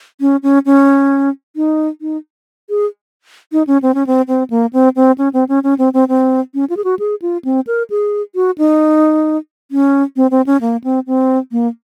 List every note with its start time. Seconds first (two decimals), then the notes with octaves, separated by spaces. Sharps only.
0.21 C#4
0.43 C#4
0.66 C#4
1.56 D#4
2.01 D#4
2.70 G#4
3.52 D#4
3.67 C#4
3.82 C4
3.94 C#4
4.07 C4
4.28 C4
4.50 A#3
4.73 C4
4.96 C4
5.18 C#4
5.33 C4
5.49 C#4
5.63 C#4
5.79 C4
5.94 C4
6.09 C4
6.54 C#4
6.70 F4
6.77 G#4
6.84 F#4
6.99 G#4
7.22 F4
7.45 C4
7.67 A#4
7.90 G#4
8.35 F#4
8.58 D#4
9.71 C#4
10.16 C4
10.31 C4
10.46 C#4
10.61 A#3
10.84 C4
11.07 C4
11.52 A#3